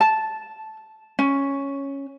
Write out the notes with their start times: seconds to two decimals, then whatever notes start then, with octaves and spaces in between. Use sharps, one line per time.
0.01 A5
1.19 C#4